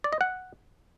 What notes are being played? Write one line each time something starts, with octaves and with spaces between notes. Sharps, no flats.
D5
D#5
F#5